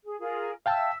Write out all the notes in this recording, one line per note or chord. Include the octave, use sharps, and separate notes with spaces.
G#4
F4 G#4 A#4
E5 F5 G5 A5 E6